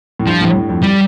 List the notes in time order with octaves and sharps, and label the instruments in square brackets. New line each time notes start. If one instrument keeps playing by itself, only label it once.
[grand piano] A2
[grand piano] G2 [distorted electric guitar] F3
[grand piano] A2
A2
F2
[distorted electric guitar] G3